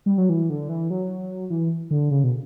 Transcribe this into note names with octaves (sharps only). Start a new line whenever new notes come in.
G3
F#3
E3
D3
E3
F#3
E3
D3
C#3
B2